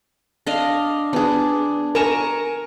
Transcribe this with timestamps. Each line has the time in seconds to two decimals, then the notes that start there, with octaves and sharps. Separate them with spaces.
0.47 D4 D#5 F5
1.13 B3 D4 G#4
1.95 A#4 G#5 A#5 C#6 E7